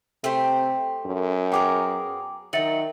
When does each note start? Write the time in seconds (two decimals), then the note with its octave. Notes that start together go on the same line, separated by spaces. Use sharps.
0.24 C3 A3 G4 C5
1.06 F#2
1.52 B3 G#4 A#4 G5 D6
2.53 D#3 F#3 D#4 E5 C#7 F#7